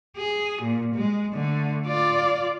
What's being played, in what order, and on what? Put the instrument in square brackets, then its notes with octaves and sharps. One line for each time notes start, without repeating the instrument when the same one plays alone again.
[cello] G#4
A#2
G#3
D3 A3
F4 D5